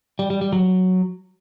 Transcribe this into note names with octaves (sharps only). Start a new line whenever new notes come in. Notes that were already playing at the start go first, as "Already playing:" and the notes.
G3
G3
G3
F#3